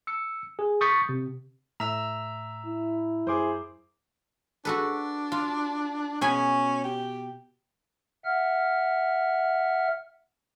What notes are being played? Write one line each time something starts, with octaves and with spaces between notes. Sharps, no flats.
E6 C#7
G#4
C#6 D#6 G6 A6 B6 C#7
C3
A2 E5 A#5 E6
E4
F#2 G#4 C5 D6
D4 F#4 A4 B4
F4
B2 C#4 G#5 B5
G4
E5 F#5 F6